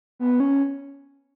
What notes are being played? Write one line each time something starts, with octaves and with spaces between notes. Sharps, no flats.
B3
C#4